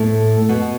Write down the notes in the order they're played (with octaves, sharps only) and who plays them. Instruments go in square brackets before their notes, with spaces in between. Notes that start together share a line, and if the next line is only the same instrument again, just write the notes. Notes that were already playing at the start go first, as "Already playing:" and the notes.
Already playing: [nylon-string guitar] A2 A3
B2 B3